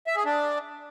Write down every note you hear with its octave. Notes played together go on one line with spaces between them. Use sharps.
E5
G#4
D4